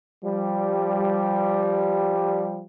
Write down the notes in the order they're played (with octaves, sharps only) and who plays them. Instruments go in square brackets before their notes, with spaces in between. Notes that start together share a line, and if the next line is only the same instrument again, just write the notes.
[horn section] F3 G3